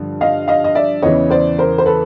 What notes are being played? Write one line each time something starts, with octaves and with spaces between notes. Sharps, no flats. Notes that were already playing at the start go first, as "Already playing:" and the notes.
Already playing: G2 D3 F3
D#5 F5
D#5 F5
D#5
D5 E5
E2 C#3 E3 C#5 D#5
C5 D5
A#4 C5
C5
A4 B4